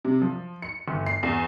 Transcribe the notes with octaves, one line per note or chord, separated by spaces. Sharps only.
C3
F3
C#7
G1
C7
E2